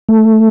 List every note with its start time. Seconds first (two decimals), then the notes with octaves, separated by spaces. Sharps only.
0.09 A3